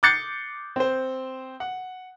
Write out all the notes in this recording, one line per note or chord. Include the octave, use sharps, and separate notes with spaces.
D6 F#6 G6 A6 C7 C#7
C4 C5
F#5